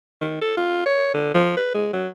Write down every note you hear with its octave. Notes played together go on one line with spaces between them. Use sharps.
D#3
A4
F4
C#5
D3
F3
B4
G#3
F#3